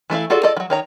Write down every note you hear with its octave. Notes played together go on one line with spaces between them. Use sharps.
E3 A3 E4 F5
F4 F#4 G#4 A4 D5
F4 A4 D5 D#5
F3 F#3
D#3 C#5 A#5